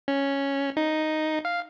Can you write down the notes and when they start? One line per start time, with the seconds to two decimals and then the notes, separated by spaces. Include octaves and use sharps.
0.08 C#4
0.77 D#4
1.45 F5